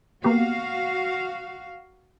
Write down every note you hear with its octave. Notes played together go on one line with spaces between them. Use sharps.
A#3 B3 F#4 G4 F5